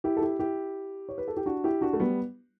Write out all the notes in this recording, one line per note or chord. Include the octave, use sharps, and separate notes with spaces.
E4 G4
A4
E4 G4
E4 G4
C#5
B4
A4
G4
D4 F#4
E4 G4
D4 F#4
A3
G3 B3